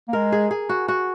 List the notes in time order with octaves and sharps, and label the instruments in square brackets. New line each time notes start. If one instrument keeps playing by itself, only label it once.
[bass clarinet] A#3
[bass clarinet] G#3 [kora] A#4
[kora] G#4
G#4
F#4
F#4